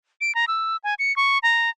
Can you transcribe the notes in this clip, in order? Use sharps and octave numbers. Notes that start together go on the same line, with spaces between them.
D7
A#5
E6
G#5
C#7
C#6
A#5